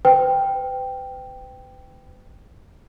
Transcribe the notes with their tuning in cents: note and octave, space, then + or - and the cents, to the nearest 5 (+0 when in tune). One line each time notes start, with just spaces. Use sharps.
B4 +40 G5 +0